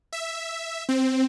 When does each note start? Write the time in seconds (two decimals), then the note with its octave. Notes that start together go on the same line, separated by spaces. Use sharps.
0.13 E5
0.89 C4